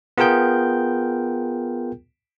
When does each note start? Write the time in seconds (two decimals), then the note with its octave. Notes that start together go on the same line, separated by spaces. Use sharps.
0.18 B3 F4 G#4 A#4 G5 G6